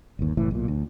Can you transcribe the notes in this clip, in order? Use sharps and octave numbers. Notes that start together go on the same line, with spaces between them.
G1 D#2
F#1 A2 E3
B1 A#2
D2